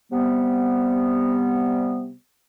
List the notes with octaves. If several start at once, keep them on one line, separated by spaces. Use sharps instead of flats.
C3 G3 B3